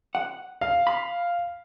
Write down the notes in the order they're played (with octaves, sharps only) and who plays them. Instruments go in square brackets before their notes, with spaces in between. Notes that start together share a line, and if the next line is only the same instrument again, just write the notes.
[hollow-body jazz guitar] F#5
[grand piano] F5
[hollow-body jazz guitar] B5